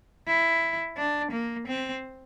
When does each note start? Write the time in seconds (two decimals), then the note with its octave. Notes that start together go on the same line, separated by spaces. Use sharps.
0.27 E4
0.97 D4
1.32 A#3
1.67 C4